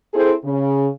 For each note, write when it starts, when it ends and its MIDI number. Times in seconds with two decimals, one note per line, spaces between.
0.13 0.33 60
0.13 0.33 64
0.13 0.33 68
0.13 0.33 69
0.13 0.33 72
0.44 0.87 49